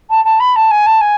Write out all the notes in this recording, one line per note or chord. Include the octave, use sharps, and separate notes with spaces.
A5
A5
B5
A5
G#5
A5
G#5